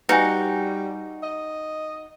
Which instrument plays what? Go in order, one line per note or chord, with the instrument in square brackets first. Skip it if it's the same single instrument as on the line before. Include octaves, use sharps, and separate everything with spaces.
[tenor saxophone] G3 [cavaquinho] D#4 F#4 [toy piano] B4 G#5
[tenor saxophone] D#5